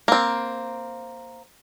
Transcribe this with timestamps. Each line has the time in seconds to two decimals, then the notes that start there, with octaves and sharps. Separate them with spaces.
0.08 A#3 C4